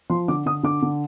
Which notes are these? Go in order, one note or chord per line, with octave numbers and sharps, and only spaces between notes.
F3 C6
D3 D6
D3 D#6
D3 D6
D3